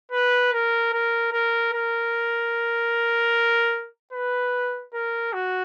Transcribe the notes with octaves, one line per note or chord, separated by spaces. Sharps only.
B4
A#4
A#4
A#4
A#4
B4
A#4
F#4